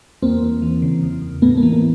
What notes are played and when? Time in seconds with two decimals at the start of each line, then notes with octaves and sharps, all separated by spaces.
0.22 E2 A#3 C4
0.42 E2
0.62 E3
0.82 C#3
1.03 E2
1.22 E2
1.42 A2 A3 B3
1.57 A#3
1.63 E3
1.73 A#3